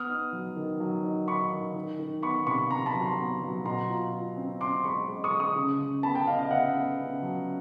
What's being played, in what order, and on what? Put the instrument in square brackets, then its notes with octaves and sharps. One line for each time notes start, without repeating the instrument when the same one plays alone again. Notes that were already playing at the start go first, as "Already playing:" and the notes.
Already playing: [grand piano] B3 D#6 F6
D#4
F#3
D#3
F#3
D#4
D#4 B5 C#6
D#3
D#3
D#3
B3 B5 C#6
C3 B5 C#6
C3 A#5 C6
A5 B5
F#3
A#5 C6
B3
F#3
B2 A#5 C6
F4
F4
C4
C4 C6 D6
G#3 B5 C#6
G#3
C#6 D#6
G#3
C#6 D#6
C#3
C#3
B3 A5 B5
G5 A5
C#3 D#5 F5
D#5 F5
B3 E5 F#5
B3
C#3
F#3